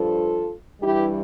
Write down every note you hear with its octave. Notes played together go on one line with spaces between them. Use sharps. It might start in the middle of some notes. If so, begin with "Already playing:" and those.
Already playing: G2 F3 F4 A4
G2 E3 G3 E4 G4